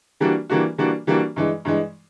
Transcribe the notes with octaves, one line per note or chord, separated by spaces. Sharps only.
E3 G3 A#3 D4 F#4
E3 G3 A#3 D4 F#4
E3 G3 A#3 D4 F#4
E3 G3 A#3 D4 F#4
G2 E3 G#3
G2 E3 G#3